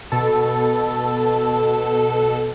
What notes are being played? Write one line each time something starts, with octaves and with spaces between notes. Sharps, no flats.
B2 A4